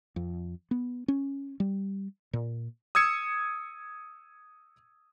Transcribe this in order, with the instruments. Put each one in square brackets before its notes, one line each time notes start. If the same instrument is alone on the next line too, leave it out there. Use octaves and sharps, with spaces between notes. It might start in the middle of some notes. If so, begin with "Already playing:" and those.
[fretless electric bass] F2
B3
C#4
G3
A#2
[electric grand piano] D#6 E6 G#6 C#7 E7